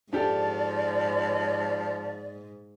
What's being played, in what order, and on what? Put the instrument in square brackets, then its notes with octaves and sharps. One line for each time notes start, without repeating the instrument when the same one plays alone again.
[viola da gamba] G#2 [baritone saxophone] F3 [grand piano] D4 G4 A4 [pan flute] D5